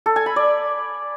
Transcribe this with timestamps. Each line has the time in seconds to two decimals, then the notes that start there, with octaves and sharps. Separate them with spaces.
0.06 A4
0.16 G#5
0.26 B5
0.36 D5